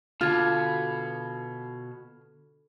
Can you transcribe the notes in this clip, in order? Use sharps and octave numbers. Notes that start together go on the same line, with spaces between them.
B2 D3 F4 F6 G#6